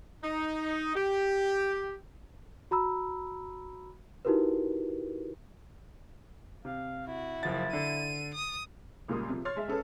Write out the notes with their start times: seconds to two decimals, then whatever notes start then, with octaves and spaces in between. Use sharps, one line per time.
0.23 D#4
0.96 G4
2.71 F#4 A#5 B5 E6
4.25 D#4 E4 F#4 G4 A#4 B4
6.65 C3 F5
7.07 E4 F#4
7.43 F#1 F3 A6
7.73 D3 D#7
8.35 D#6
9.08 C#2 A#2 G3 A#4 C6 D#6
9.29 C3 F3
9.45 C#5 C6 F6 A6
9.57 G#3 E5
9.68 C#4 G#4 A4 B4 C#5